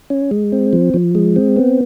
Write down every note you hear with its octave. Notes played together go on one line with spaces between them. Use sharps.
C#4
G#3
C4
F3
F3
G#3
C4
B3